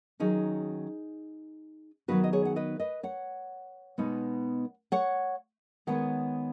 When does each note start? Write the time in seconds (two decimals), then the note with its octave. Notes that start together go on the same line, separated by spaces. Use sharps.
0.20 D#3 F#3 C#4 D#4 G#4
2.08 D#3 F#3 B3 D#4 F#4 B4
2.24 D#5
2.33 G#4 C#5
2.45 F#5
2.56 B4 D#5
2.80 B4 D#5
3.03 C#5 F#5
3.98 B2 G#3 B3 D#4
4.92 C#5 F#5
5.87 D#3 G#3 B3 C#5 F#5